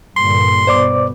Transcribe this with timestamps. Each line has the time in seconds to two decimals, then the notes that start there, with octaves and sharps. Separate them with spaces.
0.17 G2 A#2 D3 C6
0.67 B2 C5 D5 D6